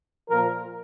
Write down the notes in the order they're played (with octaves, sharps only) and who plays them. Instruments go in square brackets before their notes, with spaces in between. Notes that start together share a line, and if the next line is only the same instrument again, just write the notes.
[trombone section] A#2 F3 A#4